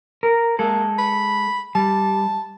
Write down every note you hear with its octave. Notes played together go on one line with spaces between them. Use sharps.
A#4
G#3 A#3 A4
B5
G3 A5